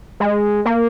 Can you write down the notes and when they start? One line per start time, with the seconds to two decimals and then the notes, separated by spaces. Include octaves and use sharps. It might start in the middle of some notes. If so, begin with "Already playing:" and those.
0.20 G#3
0.65 A#3